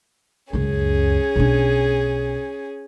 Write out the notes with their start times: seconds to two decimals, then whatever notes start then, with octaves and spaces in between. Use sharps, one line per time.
0.53 C#2 F#2 C#4 G#4
1.36 B1 D4